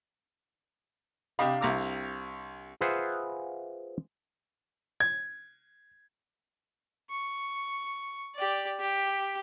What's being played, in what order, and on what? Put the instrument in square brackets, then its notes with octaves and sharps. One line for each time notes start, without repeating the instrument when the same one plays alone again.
[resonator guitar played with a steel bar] C3 D4 F5 [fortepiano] G4 D#5 B5
[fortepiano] C2 A#5 D6
[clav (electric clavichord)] F4 G#4 B4 C5 E5 F#5
[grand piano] G#6
[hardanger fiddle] C#6
G4 D5
G4